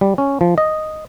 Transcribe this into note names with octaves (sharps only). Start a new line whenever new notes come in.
G3
C#4
F3
D#5